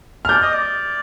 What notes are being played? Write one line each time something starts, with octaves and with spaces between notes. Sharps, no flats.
F6
D5 G6
D#5
D5